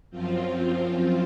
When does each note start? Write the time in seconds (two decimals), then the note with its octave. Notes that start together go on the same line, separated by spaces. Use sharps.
0.10 F#2 F3 C4 F4